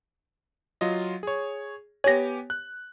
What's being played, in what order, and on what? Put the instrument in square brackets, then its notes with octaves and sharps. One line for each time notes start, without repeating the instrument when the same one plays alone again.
[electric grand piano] F#3 F4 D#5
G#4 C#5
[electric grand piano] B3 G4 G#5 [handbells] C#5 A#6
[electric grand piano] F#6